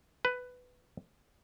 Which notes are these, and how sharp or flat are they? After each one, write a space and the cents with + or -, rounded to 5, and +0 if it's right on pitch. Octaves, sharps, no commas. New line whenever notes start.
B4 +10